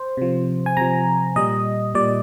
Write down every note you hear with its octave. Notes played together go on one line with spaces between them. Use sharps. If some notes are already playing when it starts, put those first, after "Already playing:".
Already playing: C5
C3 F3
G#5
C3 F3 A#5
A#2 G3 D#5
A#2 G3 D5